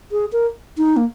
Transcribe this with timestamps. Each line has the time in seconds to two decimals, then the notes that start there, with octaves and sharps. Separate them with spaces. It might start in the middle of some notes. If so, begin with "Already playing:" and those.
0.12 G#4
0.32 A#4
0.78 D#4
0.97 A#3